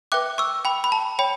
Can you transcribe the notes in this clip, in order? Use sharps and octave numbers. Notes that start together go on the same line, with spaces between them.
B4 E5 G5 D6 F#6
C#6 E6
G5 B5
B5
A5
C#5 G5 B5